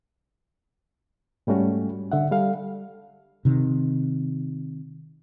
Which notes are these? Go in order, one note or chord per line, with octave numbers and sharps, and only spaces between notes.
G#2 G3 A3 C#4 F#4
D3 E5 F#5
G3 A4 F5
C3 D#3